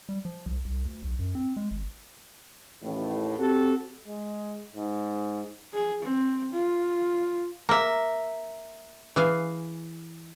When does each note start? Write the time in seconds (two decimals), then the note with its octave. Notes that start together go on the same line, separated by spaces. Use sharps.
0.09 G3
0.25 F3
0.46 C2
0.65 C2
0.85 D2
1.03 B1
1.19 F#2
1.35 C4
1.57 G#3
1.71 G#1
2.82 A1 D#2 A2
3.38 C4 F#4 G4 A4
4.08 G#3
4.76 G#2
5.74 G#4
6.03 C4
6.53 F4
7.69 A#3 E5 A#5
9.16 E3 G#4 F5